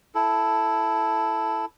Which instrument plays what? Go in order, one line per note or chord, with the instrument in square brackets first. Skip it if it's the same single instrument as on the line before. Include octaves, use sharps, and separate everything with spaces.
[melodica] E4 A4